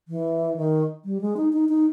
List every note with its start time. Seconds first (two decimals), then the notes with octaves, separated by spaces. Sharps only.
0.08 E3
0.57 D#3
1.05 G3
1.21 G#3
1.37 D#4
1.53 D#4
1.69 D#4